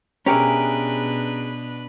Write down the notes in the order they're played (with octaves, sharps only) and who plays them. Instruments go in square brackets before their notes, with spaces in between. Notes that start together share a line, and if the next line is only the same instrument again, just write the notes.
[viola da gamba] B2 D4 B4 [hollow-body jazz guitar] C#4 G4 G#4 [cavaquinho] A#4 E5